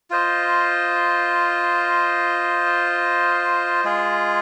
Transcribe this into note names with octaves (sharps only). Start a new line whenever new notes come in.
F4 C5 D#5
G#3 F4 G#4